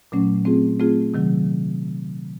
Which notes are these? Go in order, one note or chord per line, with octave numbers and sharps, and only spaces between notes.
A#2 F#3 A3 C#4
A3 C4 F4 G#4
A3 C4 F4 G#4
C3 D#3 F#3